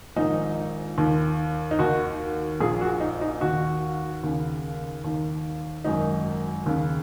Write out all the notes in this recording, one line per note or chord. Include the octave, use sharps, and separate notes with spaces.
A#1 G#2 D#3 D#4
D#2 D#3
D#4
D#2 D#3 F#4
A#1 A#2 G#4
F#4
D#4
D#4
D#2 D#3 F#4
D#2 C#3
D#2 D#3
G#1 F#2 D#3 D#4
D#2 C#3